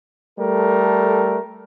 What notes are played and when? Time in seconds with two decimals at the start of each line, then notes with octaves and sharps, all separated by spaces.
0.39 G3 A3 A4 A#4